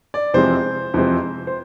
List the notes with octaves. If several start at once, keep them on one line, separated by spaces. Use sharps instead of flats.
D5
F2 C3 E3 G#3 C4 C5
F2 C3 E3 G#3 C4
C5